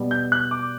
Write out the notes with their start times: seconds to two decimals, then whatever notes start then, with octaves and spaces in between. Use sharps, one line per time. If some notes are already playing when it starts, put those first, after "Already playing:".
Already playing: B2 G3 B3
0.11 G6
0.32 F#6
0.51 D6